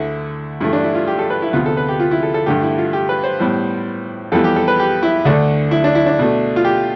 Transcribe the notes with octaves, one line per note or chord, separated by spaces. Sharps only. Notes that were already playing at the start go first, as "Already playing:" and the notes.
Already playing: D2 D3 A3 E4
G2 E3 A3 E4
D4
E4
F4
G4
A4
B4
E4
D2 C3 F3 B3 F4
A4
B4
G4
F4
E4
A4
A4
G2 D3 A3 G4
E4
F4
G4
B4
C5
A2 G3 B3
F2 E3 G3 B3 A4
G4
A4
B4
G4
E4
D2 D3 A3 D4
E4
D4
E4
D4
B2 A3
F4
G4